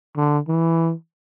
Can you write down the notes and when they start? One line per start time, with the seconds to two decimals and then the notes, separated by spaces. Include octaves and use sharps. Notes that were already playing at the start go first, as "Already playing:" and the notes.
0.16 D3
0.48 E3